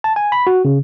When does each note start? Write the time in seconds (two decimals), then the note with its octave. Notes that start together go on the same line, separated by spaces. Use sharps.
0.04 A5
0.16 G#5
0.32 B5
0.47 F#4
0.65 C#3